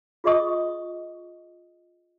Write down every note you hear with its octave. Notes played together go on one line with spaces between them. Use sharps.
F4 G#4 D5 D#5 C#6 D#6